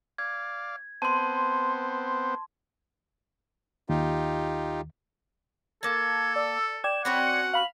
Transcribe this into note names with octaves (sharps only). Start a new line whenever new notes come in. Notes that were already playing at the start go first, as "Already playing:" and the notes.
D5 F5 G#6
B3 C4 C5 A5 C6
D#2 D#4 F4 G4
A#3 A4 A5 G#6
D5 E6
D5 G5 G#6 E7
C4 C#4 F#4 F#5 B5
C#7
F5 B5 F6 F#7